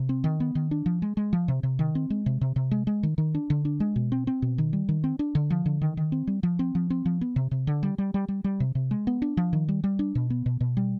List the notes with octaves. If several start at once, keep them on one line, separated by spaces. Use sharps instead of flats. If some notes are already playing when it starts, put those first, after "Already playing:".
Already playing: C3
C4
D#3
B3
D#3
D4
F3
G#3
G#3
F3
C3
C3
D#3
C4
G#3
C3
C3
C3
G#3
G#3
D#3
D#3
D4
D3
D4
G#3
B2
C4
C4
B2
D#3
G3
D#3
C4
D4
D3
F3
D3
D#3
D#3
C4
G3
F3
C4
F3
C4
F3
B3
C3
C3
D3
G3
G3
G3
G3
G3
C3
C3
G#3
B3
D4
F3
D#3
G3
G3
D4
B2
B3
B2
B2
G3